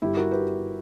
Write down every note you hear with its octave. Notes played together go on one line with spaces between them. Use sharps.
G1 E4 G4
F#4 A#4
G4 B4